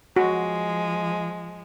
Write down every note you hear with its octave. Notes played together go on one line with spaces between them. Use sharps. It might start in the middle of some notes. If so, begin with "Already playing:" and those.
F3 G#3 F#4